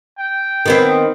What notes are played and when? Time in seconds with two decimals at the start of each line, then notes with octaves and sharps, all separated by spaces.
0.18 G5
0.66 D#3 B3 C4